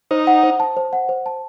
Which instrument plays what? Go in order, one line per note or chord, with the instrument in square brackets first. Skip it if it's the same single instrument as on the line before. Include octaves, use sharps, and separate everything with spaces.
[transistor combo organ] D#4 [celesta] C5
[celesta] F#5
C5
A5
C5
F#5
C5
A5